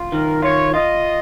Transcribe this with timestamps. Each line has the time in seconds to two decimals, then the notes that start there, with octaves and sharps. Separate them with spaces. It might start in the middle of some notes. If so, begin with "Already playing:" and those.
Already playing: F4
0.12 D#3 A#4
0.42 F4 C#5
0.73 F4 D#5